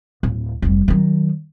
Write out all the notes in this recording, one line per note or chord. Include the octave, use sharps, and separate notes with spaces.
D1
F1 G3
D#3 F#3